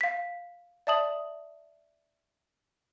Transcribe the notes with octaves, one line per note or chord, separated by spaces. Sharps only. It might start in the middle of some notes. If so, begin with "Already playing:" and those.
F5 B6
D5 E5 A5 D#6 F#7